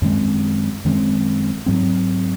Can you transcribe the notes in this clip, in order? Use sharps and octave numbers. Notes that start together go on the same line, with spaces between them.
F#2 D#3 G#3 C4
F#2 D#3 G#3 C4
G#2 F#3 C4